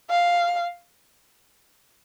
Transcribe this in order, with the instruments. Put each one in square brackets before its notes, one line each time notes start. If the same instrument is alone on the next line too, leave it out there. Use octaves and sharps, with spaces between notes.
[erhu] F5